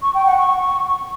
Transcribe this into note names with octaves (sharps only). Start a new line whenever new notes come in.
C#6
G5
F#5
C#6